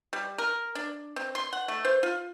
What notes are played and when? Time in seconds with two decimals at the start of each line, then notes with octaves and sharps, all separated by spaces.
0.13 G3
0.38 A#4
0.75 D4
1.16 C4
1.35 C6
1.53 F#5
1.68 A3
1.85 C5
2.03 F4